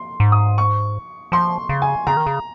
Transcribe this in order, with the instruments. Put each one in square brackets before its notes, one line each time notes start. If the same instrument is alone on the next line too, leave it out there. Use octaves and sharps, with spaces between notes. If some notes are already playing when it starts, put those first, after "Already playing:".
Already playing: [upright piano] C6
[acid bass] G#2
[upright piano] D#6
C#6
[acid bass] F3 [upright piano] C6
[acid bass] C#3
[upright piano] G#5
[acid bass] C#3 [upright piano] A#5
[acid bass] D#3
C#3